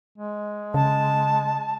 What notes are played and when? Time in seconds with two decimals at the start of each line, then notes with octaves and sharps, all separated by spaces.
0.18 G#3
0.74 C#3 A5